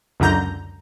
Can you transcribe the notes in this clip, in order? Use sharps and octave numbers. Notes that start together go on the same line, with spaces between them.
C#2 F#2 D3 A#5 G6